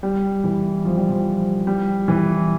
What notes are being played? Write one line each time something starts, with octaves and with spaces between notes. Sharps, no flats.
G3
E3
F3
G3
F3
G3
E3